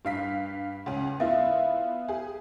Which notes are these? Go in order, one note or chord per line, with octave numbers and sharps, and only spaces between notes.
G2 F5 B6
C#2 C#4
B3 E4 F4 E5 F5
G4 G#4